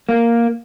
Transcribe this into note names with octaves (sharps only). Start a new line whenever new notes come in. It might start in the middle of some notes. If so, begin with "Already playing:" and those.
A#3